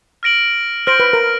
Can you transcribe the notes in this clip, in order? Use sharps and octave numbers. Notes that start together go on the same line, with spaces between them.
F6 A#6 D7 F#7
C5 F6 A#6 D7 F#7
B4
A#4